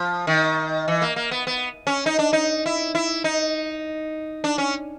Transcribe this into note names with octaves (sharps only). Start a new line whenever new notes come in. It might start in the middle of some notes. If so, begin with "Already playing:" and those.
Already playing: F3
D#3
E3
A#3
A#3
B3
B3
C#4
D#4
D4
D#4
E4
E4
D#4
D4
C#4